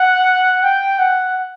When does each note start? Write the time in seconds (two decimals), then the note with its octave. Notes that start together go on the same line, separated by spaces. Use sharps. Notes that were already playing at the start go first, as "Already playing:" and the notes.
Already playing: F#5
0.63 G5
0.99 F#5